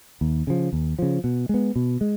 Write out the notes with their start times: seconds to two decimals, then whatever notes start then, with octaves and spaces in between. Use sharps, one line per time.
0.21 D#2
0.47 C#3 F3
0.73 D#2
0.99 C#3 F3
1.24 B2
1.49 G#3 B3
1.76 B2
2.01 G#3